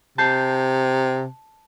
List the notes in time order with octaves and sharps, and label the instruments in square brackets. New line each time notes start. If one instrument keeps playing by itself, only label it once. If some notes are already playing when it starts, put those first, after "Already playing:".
[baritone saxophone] C3 [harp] A5 G6 C7